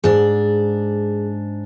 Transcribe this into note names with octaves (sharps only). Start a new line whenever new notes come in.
G#2 D4 G#4